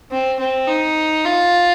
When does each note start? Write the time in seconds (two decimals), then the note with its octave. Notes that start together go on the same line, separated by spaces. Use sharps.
0.11 C4
0.40 C4
0.68 D#4
1.25 F4